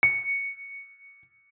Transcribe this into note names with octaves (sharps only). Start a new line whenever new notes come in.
C#7